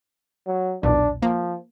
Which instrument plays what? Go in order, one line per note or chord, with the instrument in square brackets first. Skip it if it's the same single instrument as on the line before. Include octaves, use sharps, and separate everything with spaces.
[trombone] F#3
[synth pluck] B1 E2 A#2 [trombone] D4
[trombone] F3 [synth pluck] A#3